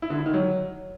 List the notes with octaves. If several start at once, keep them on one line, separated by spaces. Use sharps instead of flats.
E4
D3
E4
D#3
F#3